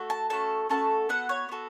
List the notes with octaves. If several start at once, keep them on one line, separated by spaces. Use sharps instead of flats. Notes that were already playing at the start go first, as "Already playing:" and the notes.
Already playing: A3 F#4 A4
A5
A3 C#4 F#4 A4 A5
A3 C#4 F#4 A4 A5
B3 F#4 A4 F#5
C#5
B3 F#4 A4